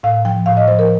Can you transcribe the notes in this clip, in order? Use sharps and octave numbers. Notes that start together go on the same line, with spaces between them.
A2 F5
F3 G5
A2 F5
D#5
F3 C5
A#4